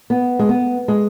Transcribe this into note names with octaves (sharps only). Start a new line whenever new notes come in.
B3
G#3
B3
G#3